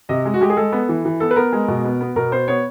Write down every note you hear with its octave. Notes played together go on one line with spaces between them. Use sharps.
C3 D#5
G#3
F#4
G#3 G4
G#4
G#3 A4
B3
E3
E3
B3 A4
B4
B3 A#4
G#3
B2
B3
B3
B2 A#4
B3 C5
B3 C#5